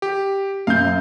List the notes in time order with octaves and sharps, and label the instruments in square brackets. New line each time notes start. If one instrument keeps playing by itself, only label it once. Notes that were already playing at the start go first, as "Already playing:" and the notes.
[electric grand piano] G4
[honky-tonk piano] F#2 [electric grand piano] F5 G6